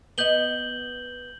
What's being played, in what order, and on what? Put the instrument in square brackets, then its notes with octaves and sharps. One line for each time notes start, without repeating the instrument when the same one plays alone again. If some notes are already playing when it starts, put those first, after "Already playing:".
[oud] B3 D#5 [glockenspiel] G6 F#7 G7